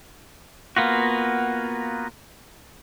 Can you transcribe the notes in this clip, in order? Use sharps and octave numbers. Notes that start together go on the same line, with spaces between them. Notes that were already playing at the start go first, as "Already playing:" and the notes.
A#3 B3 F4 F#4